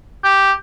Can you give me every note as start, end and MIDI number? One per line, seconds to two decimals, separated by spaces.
0.24 0.52 67